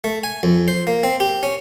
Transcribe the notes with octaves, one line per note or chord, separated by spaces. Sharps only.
A3
G#5
F2
C5
A#3
C4
G4
C#4